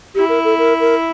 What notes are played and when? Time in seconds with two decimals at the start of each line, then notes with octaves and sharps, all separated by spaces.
0.15 E4 G4
0.29 A#4
0.44 A4
0.59 A#4
0.80 A#4